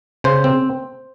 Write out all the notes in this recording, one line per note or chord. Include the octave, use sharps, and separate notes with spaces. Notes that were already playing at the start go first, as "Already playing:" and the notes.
C#3 C5
C4